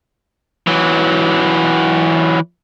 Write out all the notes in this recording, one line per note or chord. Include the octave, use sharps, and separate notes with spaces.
E3 F#3